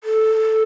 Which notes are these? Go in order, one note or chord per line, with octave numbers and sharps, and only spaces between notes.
A4